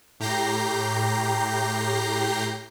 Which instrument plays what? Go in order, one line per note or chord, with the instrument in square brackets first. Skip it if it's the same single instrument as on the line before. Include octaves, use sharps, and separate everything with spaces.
[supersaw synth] A2 G4 A#5 G6 A#6 C7